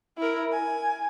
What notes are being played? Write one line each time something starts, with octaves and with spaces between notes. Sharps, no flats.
E4 A#4
G#5